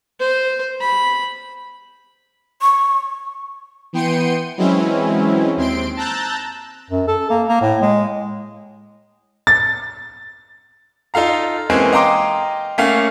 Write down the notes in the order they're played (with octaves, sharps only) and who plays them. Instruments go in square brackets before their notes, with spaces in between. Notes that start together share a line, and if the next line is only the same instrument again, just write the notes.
[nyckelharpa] C5
B5
[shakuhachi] C#6
[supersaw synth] E3 B3 G5 C6 C#7 D#7
E3 F#3 G#3 C4 C#4 E4
D#2 C4 C6 D7
A5 A#5 E6 F#6 G6 A6
[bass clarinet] F#2
A4
A#3
A#3
A2
G#3
[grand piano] A6
D#4 F4 A4 F5 A#5
E3 G#3 A#3 C4 C#4
D#5 F5 G5 A#5 C6 D6
A3 A#3 C#4 F5